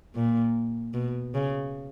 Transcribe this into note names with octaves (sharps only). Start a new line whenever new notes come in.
A#2
B2
C#3